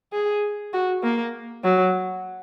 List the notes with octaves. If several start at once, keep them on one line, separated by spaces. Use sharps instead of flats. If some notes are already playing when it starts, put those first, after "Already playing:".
G#4
F#4
A#3
F#3